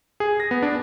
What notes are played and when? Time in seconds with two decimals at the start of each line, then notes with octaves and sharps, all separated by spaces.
0.20 G#4
0.40 A#6
0.51 B3
0.63 D4